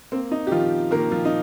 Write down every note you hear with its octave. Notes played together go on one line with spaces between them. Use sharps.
A#3 C4
D#4
G4
D#3 F3 F4
D#3 A#3 A#4
F3 F4
D#4